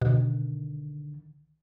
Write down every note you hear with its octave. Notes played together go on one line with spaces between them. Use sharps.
C2 B2 D3 D#3